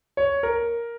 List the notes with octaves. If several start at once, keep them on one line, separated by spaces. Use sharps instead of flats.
C#5
A#4